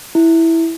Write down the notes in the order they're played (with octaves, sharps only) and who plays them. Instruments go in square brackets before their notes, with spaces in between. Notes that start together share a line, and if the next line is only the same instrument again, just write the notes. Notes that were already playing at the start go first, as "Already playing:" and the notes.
[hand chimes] E4